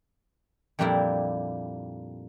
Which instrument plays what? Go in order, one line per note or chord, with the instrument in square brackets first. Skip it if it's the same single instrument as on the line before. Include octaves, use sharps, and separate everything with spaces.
[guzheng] F2 A#2 G3 A#3 D4 E4